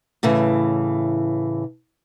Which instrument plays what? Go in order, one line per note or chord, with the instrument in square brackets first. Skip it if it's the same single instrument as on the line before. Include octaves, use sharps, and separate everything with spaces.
[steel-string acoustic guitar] A2 C#3 E3